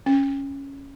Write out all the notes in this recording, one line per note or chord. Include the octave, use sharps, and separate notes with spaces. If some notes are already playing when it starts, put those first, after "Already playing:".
C#4